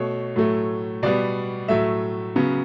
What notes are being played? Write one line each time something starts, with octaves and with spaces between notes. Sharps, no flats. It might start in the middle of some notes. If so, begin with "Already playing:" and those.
Already playing: B2 A3 C#5
A2 F#3 A3
B2 G3 B3 D5
A2 F#3 A3 E5
C#3 F#3 B3